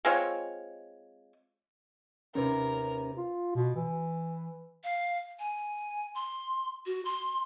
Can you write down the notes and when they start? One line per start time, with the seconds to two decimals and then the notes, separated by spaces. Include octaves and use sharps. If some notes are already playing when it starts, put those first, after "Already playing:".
0.05 G#3 C4 F4 C#5
2.35 D#2 C3 C#4 A#4 B4
3.17 F4
3.55 B2
3.76 E3
4.84 F5
5.39 G#5
6.15 C6
6.86 F#4
7.05 C6